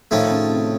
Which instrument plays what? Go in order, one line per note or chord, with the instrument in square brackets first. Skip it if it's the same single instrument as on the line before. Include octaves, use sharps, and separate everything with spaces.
[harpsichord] A2 F3 A3 D#4 [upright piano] D#3
[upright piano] C#3
C3